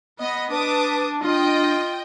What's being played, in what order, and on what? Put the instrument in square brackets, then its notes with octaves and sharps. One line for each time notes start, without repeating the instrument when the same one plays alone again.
[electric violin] B3 [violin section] D#5
[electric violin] D4 [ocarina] B4 [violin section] A5 D6 D#6
[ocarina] D4 [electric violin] F4 [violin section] D#5 G5